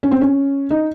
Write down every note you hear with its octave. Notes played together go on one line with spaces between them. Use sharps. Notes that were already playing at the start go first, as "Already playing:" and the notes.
C#4
C4
C#4
D#4